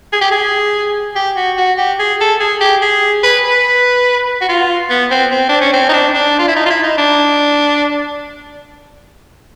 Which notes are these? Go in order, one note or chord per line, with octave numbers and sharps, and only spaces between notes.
G#4
G4
G#4
G4
F#4
F#4
G4
G#4
A4
G#4
G4
G#4
B4
B4
F#4
F4
B3
C4
C4
D4
C#4
C4
D#4
D4
D4
F4
E4
D#4
F4
E4
D#4
D4